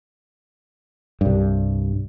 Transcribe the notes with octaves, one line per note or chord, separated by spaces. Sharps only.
C2 G2